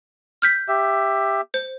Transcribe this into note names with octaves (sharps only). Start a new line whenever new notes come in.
F6 G6 B6
G4 E5
C5